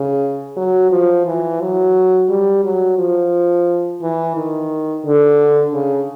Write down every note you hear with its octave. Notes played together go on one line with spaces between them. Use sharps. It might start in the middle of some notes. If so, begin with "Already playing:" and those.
Already playing: C#3
F#3
F3
E3
F#3
G3
F#3
F3
E3
D#3
D3
C#3